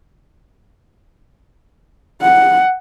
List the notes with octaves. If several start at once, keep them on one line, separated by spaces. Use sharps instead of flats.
F#5